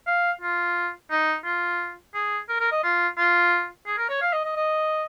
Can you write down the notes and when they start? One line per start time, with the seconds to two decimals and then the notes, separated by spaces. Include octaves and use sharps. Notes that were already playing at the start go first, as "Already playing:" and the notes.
0.07 F5
0.41 F4
1.11 D#4
1.45 F4
2.14 G#4
2.49 A#4
2.59 A#4
2.71 D#5
2.83 F4
3.18 F4
3.86 G#4
3.98 A#4
4.09 C#5
4.21 F5
4.33 D#5
4.44 D#5
4.56 D#5